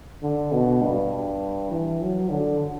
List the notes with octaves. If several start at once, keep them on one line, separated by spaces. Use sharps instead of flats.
D3
B2
G2
E3
F#3
D3